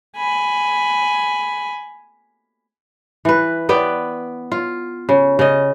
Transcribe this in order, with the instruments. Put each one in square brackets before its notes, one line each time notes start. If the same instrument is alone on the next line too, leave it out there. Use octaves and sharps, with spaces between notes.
[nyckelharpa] G#5 B5
[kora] E3 B4
B3 B4 D5 G5
F4
C#3
C#3 D#5